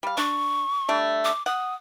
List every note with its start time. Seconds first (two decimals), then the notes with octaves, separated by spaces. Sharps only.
0.03 G3 F5
0.17 D4 C#6
0.88 G3 A3 D4
1.25 D6
1.46 F#5 D#6